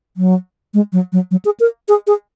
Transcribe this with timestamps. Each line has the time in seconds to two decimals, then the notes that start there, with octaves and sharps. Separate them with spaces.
0.17 F#3
0.74 G#3
0.92 F#3
1.12 F#3
1.31 F#3
1.45 G#4
1.60 A#4
1.88 G#4
2.07 G#4